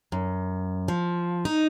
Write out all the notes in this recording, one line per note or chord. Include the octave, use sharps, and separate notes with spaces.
F#2
F3
D#4